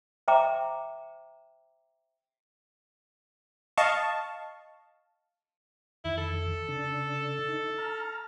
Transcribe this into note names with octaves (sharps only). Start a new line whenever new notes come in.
C5 E5 G5 A#5 D6
D#5 F5 A5 C#6
F2 D#3 E4
A4
C#3 D4
D#4
A5 A#5 F6